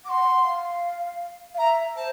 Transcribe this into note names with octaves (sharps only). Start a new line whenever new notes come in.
F#5 C6 D6
F5
F5
E5 A#5
C5 A5